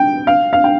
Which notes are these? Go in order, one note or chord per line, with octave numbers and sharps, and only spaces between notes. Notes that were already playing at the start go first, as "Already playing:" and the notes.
Already playing: G5
F5
F5
G5